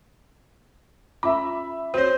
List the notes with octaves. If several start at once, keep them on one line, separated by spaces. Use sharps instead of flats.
C#4 F4 E5 B5 D6
C4 F#4 C5 C#5